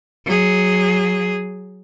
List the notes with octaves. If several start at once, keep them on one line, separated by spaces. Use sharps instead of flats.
F#3 G#4